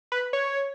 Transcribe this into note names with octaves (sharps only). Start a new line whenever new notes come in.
B4
C#5